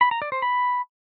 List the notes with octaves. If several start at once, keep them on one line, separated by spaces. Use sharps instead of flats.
B5
A#5
D5
C5
B5